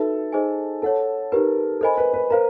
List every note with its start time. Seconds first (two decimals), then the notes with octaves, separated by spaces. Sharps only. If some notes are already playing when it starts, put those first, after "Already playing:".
Already playing: D#4 F#4 A4 B4 E5
0.32 D#4 G#4 C5 D#5 G#5
0.82 A4 C#5 F#5 A5
1.32 D#4 G4 A#4 B4
1.81 A4 A#4 C5 D#5 G#5 B5
1.97 B4
2.13 B4
2.30 A#4 C5 F5 A#5